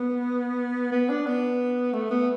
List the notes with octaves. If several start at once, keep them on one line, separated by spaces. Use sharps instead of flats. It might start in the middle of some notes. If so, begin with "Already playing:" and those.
Already playing: B3
B3
D4
B3
A3
B3